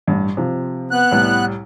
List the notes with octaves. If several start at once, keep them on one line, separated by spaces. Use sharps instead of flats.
A1 G2
C3 F3
B3 F#6
C2 A2 G3